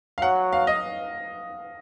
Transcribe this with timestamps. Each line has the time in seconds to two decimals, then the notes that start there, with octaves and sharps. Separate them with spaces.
0.18 F5
0.22 F#3 F#5
0.53 F5
0.67 D#5